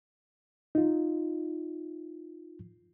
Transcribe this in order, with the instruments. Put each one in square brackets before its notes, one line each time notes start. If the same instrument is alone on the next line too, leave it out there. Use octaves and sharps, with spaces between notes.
[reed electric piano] D#4 F4